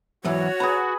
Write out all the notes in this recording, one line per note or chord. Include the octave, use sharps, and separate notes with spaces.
E3 F#3 B3 F#4 C#5
G#4 B4 A#5